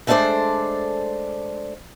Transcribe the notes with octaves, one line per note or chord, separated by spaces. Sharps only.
G#3 A3 D4 A4 C5 D5